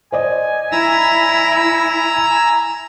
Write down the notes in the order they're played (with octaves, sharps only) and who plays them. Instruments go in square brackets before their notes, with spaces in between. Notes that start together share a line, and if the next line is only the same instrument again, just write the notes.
[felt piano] C5 D5 D#5 [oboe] G#5
[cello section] E4 [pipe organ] A#5 E6